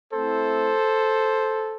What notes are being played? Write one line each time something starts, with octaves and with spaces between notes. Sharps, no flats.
A3 C4 E4 A4 C5